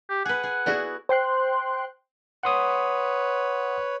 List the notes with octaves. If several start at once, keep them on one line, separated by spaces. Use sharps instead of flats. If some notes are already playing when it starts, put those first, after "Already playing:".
G4
G#4 B4 F#5
G#4
B3 E4 F#4 G#4 D5
C5 G5 C6 F#6
B4 C#5 F#5 C6 D#6